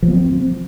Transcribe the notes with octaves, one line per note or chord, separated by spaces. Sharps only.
F3
A#3
C4